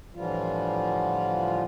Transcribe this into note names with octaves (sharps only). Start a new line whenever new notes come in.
A2 D3 E3 F3 G3 F4